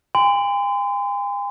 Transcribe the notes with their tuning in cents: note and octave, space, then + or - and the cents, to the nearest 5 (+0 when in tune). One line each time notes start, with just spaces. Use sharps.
G#5 -45 C6 -35